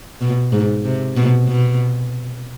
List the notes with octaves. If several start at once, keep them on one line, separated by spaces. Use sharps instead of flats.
B2
G#2
C3
B2
B2